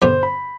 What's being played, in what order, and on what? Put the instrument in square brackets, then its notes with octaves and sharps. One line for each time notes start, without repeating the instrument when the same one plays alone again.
[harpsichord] G2 D3 G3 B3 D4 [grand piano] C5
[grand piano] B5